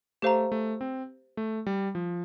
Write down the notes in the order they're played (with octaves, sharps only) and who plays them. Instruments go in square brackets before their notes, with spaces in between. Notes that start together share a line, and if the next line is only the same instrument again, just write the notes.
[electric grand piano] A3 [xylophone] G4 C5 F5 A#5
[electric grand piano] A3
C4
A3
G3
F3